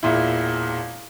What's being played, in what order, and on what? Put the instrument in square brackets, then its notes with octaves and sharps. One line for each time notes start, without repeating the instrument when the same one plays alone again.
[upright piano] E1 A#2 E4